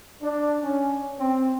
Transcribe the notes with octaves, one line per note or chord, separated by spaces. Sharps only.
D4
C#4
C4